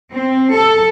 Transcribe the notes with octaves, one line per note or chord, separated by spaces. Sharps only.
C4
A4